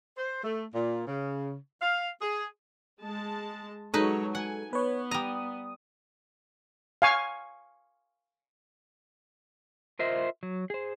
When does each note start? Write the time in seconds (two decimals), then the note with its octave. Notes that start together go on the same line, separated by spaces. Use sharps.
0.17 C5
0.44 A3
0.73 A#2
1.07 C#3
1.82 F5
2.21 G#4
3.03 G#3 A5
3.94 F#3 G#3 D#4 A4 B4 C#5
4.35 F#5 G#5
4.73 B3 B4 C#5
5.11 G3 A#5 D#6
7.02 F5 G#5 C#6
9.99 F4 A#4 C5 D#5 E5
10.43 F#3
10.70 G#4 C5